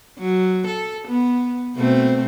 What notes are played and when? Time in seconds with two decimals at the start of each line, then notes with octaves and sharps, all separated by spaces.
0.19 F#3
0.66 A4
1.07 B3
1.75 B2 A3 C4